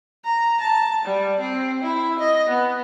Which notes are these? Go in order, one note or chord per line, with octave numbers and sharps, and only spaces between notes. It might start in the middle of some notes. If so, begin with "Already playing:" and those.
A#5
A5
G3
C4
E4
D#5
B3